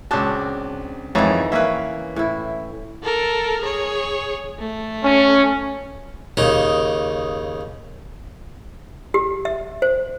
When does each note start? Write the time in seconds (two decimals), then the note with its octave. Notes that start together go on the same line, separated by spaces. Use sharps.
0.11 C#2 C4 D4 F#4 A5
1.15 F2 G#2 D#3 E3 C#5
1.52 A#3 C#4 B4 E5
2.16 A2 E4
3.03 A4 A#4
3.61 G#4 C#5
4.59 A3
5.04 C#4
6.37 D#2 C#3 D#4
9.14 G4
9.45 E5
9.82 C5